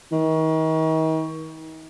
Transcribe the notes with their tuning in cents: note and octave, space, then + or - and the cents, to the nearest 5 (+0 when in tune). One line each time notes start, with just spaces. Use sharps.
D#3 +40